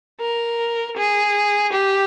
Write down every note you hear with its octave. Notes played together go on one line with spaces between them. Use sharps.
A#4
G#4
G4